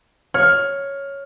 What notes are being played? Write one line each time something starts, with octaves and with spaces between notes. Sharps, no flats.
C#5 F6